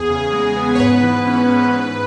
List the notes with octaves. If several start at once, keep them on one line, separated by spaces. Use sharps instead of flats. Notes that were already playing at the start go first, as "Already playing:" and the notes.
Already playing: E2 G#4
C#3
G#3
B3
C#5
G#2 B4
E3
C#4
G#2
G#2